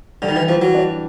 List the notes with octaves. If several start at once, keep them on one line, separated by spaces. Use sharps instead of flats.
D3 G3
D#3
E3
E3 F3
F#3
D4